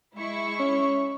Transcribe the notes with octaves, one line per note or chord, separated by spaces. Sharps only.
G#3 E4 C#6
C#4